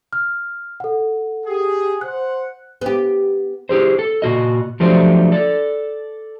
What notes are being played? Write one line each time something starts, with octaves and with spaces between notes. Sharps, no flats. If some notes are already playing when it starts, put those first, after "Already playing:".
F6
A4 F#5
G4 G#4
C5 F#5 F#6
B3 G4
E4 G4 G#4 C5
A4
A#2 F#4 D#5
F3 F#3 A3 D4 G4 C5
A4 D5